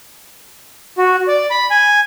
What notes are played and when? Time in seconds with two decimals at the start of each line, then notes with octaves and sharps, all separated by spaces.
0.98 F#4
1.28 D5
1.50 B5
1.71 G#5